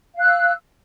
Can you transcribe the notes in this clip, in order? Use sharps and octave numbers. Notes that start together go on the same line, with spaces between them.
F5 E6 F#6